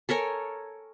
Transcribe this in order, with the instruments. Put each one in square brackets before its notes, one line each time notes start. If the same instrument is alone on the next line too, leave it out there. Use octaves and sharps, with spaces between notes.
[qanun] A4 A#4 C#5 G#5